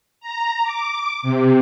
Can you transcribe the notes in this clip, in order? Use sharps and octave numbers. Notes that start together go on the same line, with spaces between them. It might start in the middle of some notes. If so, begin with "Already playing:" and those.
A#5
D6
C3